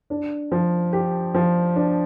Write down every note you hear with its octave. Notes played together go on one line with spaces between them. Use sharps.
D4
F3
G4
F3
D4